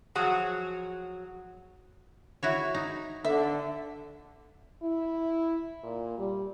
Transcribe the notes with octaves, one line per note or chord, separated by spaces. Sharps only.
F3 F#3 F#4 G#4
E4 F#4 C#5
D#4
D3 E5
E4
A#2
G3